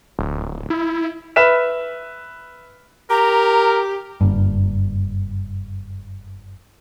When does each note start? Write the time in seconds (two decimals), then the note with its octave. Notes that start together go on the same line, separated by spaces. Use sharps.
0.19 D1
0.70 E4
1.36 B4 E5 F6 B6 E7
3.10 G4 A#4 A#5
4.21 F#1 G2